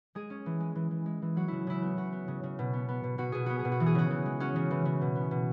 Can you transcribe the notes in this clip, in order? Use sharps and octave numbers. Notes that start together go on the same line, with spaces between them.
G#3 G#4
C#4
E3
G#3
E3
E3
G#3
E3
F#3 F#4
C#3 E4
C#3 E4
B3
C#3 F#4
B3
C#3
C#3
B2
B3
B3
B2
B2 F#4
B2 G#4
B3 F#4
G#4
B2
F#4
E3
G#4
C#3 F#4
E3
G#3
C#4 F#4
C#3
E3
C#3
B2
B3
B2